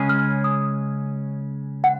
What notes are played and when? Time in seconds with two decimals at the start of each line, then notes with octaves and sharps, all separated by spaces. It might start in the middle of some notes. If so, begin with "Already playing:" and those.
Already playing: C#3 G#3 C#4 G#4
0.09 F6
0.44 D#6
1.84 F#5